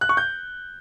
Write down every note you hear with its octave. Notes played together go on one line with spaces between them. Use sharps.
F#6
C#6
G6